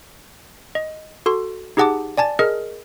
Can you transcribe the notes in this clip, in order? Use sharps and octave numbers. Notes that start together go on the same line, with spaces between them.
D#5
F#4 A4 C6
D#4 G4 G#4 F#5 A5 D6
D5 G#5 A5 A6
G#4 A#4 D#5 F6